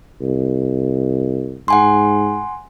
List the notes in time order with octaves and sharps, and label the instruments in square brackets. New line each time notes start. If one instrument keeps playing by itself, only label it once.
[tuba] C2
[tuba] G#2 [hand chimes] F#5 G#5 C6